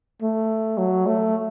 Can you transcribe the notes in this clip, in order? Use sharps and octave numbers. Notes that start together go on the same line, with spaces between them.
A3
F#3
A3